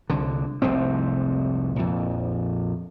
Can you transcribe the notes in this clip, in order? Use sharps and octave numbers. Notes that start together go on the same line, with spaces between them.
C2 D3
F1 C2 G#2 C4
A#1 F2